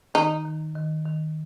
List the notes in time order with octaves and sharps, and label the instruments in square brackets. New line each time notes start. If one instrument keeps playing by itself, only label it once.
[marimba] D#3 [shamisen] D#4
[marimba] D#3
D#3
D#3